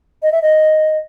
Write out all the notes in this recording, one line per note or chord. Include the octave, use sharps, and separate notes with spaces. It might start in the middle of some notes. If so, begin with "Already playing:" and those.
D#5
E5
D#5